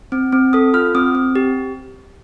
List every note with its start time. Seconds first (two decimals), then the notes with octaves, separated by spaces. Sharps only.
0.12 C4
0.32 C4
0.53 A4 D#6
0.74 F4 F6
0.95 C4 D#6
1.15 C4
1.35 G4